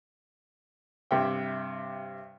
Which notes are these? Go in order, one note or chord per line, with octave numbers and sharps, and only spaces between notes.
G2 C3 E5 G5